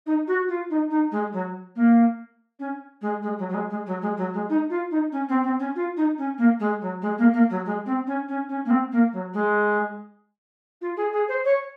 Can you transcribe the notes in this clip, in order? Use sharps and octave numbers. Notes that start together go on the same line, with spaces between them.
D#4
F#4
F4
D#4
D#4
G#3
F#3
A#3
C#4
G#3
G#3
F#3
F#3
G#3
G#3
F#3
G#3
F#3
G#3
D#4
F4
D#4
C#4
C4
C4
C#4
F4
D#4
C#4
A#3
G#3
F#3
G#3
A#3
A#3
F#3
G#3
C4
C#4
C#4
C#4
A#3
C4
A#3
F#3
G#3
F4
G#4
G#4
C5
C#5